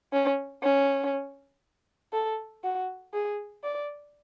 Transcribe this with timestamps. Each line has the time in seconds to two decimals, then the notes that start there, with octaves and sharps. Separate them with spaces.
0.13 C#4
0.63 C#4
2.13 A4
2.64 F#4
3.13 G#4
3.63 D5